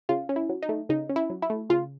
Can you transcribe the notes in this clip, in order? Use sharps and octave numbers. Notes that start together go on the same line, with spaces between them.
C#3 F4
C#4
E4
F#3
D#4
A3
C#3 D#4
C#4
E4
F#3
E4
A3
C#3 F4